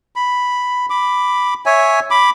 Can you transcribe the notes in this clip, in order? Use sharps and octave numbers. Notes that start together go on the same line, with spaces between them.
B5
B5 D6
C#5 E5 G#5
B5 D6